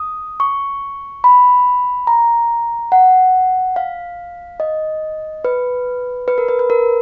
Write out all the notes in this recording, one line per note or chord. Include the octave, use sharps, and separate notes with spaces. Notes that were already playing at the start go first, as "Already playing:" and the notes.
Already playing: D#6
C#6
B5
A#5
F#5
F5
D#5
B4
B4
A#4
B4
B4
A#4